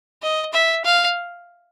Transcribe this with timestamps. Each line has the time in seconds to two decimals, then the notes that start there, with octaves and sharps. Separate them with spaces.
0.22 D#5
0.53 E5
0.84 F5